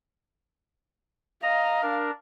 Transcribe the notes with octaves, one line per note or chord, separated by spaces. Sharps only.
D#5 F5 A#5
D4 A#4